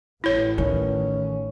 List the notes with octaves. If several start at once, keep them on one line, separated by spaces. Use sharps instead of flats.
A1 E4 C#5
D#3 C#4